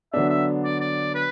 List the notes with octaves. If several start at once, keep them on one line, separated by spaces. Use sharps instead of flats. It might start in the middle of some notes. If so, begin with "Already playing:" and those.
D3 F#3 B3 D4 E5
E5
D5
D5
B4